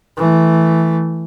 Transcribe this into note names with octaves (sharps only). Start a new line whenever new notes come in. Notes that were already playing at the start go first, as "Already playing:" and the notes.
E3 A3